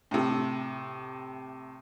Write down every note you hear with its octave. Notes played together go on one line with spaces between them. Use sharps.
A2 C3